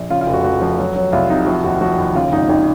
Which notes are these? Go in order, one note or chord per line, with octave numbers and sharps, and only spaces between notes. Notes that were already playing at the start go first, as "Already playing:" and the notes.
Already playing: A#1
C#3 F4
F4
F1
F#4
F3 F#4
F3
F#3
F#3
C2 F4
C3 D#4
F3 F#4
D#2 F#4
F3 F#4
D#2
C#3 F4
G#1 D#4
G#1 D#4